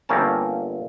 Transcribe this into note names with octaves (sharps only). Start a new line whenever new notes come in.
G1 A#3 C4 C#4 A#4 A5